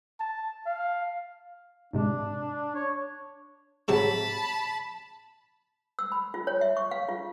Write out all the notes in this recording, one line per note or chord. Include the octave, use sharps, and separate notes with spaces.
A5
F5
G#2 C3 G#3 D4
C#5
G#2 C3 F#3 A5 B5
E6
B5
F4
C#5
E5
C#6
F5
F4